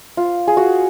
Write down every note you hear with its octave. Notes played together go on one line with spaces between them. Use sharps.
F4
G#4
F#4